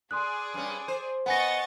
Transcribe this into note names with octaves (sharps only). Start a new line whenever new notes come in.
G#4 D5 C6 D#6 F#6
G2 C#4
C5
B3 D#5 F#5 G#5 C#6 A6 A#6